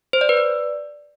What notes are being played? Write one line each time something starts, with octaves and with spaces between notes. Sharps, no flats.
C5
D5
B4
D5